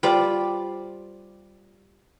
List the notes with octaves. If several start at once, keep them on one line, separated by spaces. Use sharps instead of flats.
G3 F4 C5 D5